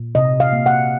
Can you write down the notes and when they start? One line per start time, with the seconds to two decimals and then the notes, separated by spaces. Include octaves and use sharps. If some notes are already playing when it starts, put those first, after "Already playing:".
Already playing: A#2
0.15 C3 D#5
0.40 F5
0.53 A#3
0.66 F#5